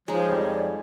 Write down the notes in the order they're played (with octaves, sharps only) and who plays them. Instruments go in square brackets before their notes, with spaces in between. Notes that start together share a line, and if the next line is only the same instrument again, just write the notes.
[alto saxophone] F3 [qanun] G#3 D#4 [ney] C#5
[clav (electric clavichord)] F2 G3
[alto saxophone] D5